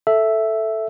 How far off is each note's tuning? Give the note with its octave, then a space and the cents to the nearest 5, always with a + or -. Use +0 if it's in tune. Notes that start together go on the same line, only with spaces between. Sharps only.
A4 +0 E5 +0